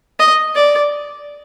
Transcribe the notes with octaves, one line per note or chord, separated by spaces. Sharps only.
D#5
D5